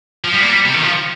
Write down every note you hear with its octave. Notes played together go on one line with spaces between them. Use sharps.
F3
G3
A#3
G3
C3
D#3
F3